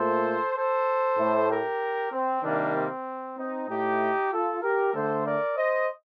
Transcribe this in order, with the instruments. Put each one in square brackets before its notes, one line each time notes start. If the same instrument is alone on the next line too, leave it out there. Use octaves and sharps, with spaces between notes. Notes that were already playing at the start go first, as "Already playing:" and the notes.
Already playing: [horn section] A#2 A3 A4 C5
A4 C5
A2 A3
G4 A#4
C4
C3 D#3 G3 A#3 D4
C4
C4 D#4
A2 A3 D#4 G4
F4 A4
G4 A#4
D3 A3 A4 C5
A#4 D5
C5 D#5